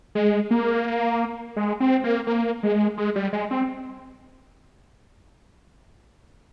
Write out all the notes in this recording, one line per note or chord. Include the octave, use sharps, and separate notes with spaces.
G#3
A#3
G#3
C4
A#3
A#3
G#3
G#3
G3
G#3
C4